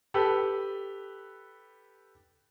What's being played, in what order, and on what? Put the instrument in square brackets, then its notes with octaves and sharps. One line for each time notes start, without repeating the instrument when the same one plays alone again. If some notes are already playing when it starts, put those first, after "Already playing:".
[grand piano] G4 A4 B4